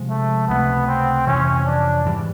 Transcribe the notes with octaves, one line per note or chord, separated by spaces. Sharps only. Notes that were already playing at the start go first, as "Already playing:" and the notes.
Already playing: C3 F3 G#3
A3
C#2 C3 F3 A3 B3
C4
F2 C3 E3 C#4
D4
G#2 E3 G3